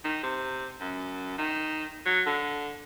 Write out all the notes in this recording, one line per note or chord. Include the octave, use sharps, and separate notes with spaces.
D#3
C3
F#2
D#3
F#3
D3